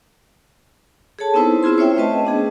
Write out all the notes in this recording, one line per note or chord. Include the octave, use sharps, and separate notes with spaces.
G#4 A4 C#5 A5
B3 C4 D#4 E4 B4 C5
C4 E4 F4 G#4 C6
C#4 C5 C#5 E5 G5
A3 C#4 B4 D#5 A5
B3 D4 G#4